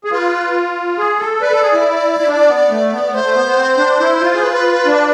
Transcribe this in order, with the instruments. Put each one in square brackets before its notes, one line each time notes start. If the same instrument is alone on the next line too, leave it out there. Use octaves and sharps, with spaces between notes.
[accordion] G#4
[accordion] F4 [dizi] B4
[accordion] G#4
A4
[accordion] B4 [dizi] D5
[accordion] A4
G#4
E4
E4
D4
B3
A3
B3
B3
[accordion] A3 [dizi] C5
[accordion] A3
B3
B3
C4
D4
E4
F4
G#4
[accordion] F4 [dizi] B4
[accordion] D4